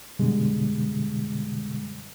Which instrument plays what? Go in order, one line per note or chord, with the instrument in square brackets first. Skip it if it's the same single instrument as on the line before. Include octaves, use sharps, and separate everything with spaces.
[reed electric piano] F#2 B2 D3 G3 G#3